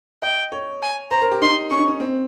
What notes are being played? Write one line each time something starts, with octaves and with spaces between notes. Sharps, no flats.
D#5 G5
C#5
G#5
C5 A#5
A#4
G4
D#4 C6
C#4 C#6
D#4
C#4
C4